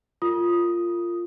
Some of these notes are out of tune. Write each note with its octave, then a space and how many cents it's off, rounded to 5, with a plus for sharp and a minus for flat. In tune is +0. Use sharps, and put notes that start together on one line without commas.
F4 -10 A#4 -35 D#6 +0